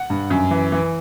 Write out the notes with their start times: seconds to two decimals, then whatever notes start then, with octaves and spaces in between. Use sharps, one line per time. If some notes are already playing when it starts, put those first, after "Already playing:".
Already playing: F#5
0.10 G2
0.30 F#2
0.51 E3
0.72 E3